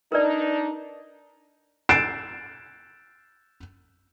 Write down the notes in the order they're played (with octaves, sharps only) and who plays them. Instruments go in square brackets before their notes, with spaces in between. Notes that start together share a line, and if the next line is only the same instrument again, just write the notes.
[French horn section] D4 D#4 [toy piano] A#4 B4 D5
[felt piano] A6 C7 D7 E7